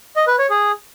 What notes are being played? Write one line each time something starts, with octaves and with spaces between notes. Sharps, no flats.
D#5
B4
C#5
G#4